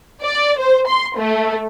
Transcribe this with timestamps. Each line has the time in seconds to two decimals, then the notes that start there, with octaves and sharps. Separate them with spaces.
0.23 D5
0.59 C5
0.87 C6
1.18 A3